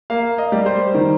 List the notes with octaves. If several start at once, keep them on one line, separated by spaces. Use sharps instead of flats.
A#3 F5
D#5
G3
C5
D#3